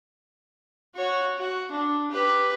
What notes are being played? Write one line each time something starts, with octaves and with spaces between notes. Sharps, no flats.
F#4 C#5
F#4
D4
G4 B4